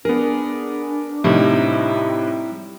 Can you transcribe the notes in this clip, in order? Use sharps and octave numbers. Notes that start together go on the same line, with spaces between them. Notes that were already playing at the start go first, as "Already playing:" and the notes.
B3 D4 G#4 A#4
A2 C3 G3 D#4 E4